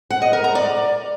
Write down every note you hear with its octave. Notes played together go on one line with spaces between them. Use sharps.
F#5
D#5
A#4
A#5
D5